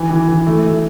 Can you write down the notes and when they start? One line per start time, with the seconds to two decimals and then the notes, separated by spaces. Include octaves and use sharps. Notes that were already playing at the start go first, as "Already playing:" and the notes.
Already playing: E3
0.10 E3
0.28 E3
0.47 A3
0.64 A3